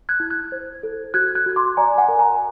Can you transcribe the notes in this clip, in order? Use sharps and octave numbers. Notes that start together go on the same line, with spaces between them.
F#6 G#6
E4
F#6 G#6
C5
A4
F#4 F#6 G#6
F#6 G#6
F#4
C6 D6
D5 G#5 A#5
F#5 G#5
A#4
G#5 A#5